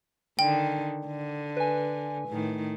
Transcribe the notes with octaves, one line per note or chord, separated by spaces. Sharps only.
D3 D#3 G5
D3
B4 G#5
A2 D#3